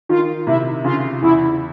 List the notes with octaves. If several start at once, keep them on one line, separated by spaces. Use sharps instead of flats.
D#3 F4
C3 E4
C#3 F4
E2 E4